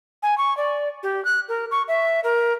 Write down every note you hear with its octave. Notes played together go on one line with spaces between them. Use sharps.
G#5
C#6
D5
G4
F#6
A#4
C#6
E5
A#4